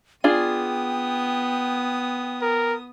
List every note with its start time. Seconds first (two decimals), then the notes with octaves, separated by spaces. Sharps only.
0.24 B3 D4 F4 G#4 G5 D#6
2.41 A#4